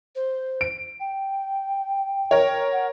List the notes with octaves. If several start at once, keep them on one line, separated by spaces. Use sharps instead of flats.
C5
D7
G5
A#4 C#5
F#5